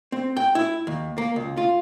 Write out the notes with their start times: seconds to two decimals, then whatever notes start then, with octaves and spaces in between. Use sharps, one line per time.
0.12 C4
0.37 G5
0.55 E4
0.87 D#2
1.18 A#3
1.36 C#2
1.57 F4